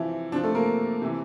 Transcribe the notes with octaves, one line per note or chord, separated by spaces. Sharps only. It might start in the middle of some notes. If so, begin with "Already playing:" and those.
Already playing: C3 E3 F3 E4
C3 F3 D4
A3 A4
A#3 A#4
C3 E3